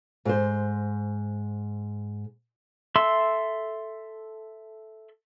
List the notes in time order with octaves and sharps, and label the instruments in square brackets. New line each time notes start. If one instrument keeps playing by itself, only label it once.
[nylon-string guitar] G#2 C5
[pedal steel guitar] A4 E5 C6 E6